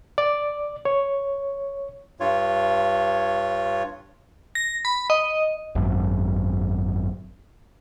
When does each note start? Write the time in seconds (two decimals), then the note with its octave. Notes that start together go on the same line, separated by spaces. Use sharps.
0.18 D5
0.85 C#5
2.20 G2 F4 C#5
4.55 A#6
4.85 B5
5.10 D#5
5.75 G#1 F#2